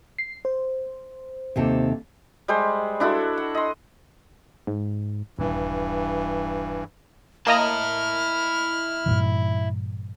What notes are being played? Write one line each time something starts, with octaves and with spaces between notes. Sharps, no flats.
C7
C5
D#2 C3 A4
G3 G#3 C5
D4 E4 F#4 A4
F#5
D#5 C6
G#2
D#1 G2 E3
A#3 E4 D#5 A5 A#5 F6
G2 A#2 E3